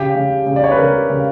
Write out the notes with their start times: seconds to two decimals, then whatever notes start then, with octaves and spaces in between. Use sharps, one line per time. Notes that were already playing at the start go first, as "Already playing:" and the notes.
Already playing: C#3 G4
0.15 C#3
0.46 C#3
0.56 D5
0.64 C#5
0.71 B4
0.78 C#3 A#4
1.10 C#3